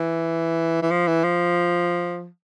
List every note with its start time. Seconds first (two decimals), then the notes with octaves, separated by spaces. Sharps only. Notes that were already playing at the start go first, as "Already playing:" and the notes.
Already playing: E3
0.82 E3
0.91 F3
1.07 E3
1.24 F3